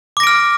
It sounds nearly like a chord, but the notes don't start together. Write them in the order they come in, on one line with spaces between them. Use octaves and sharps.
D6 A#6 D7 F6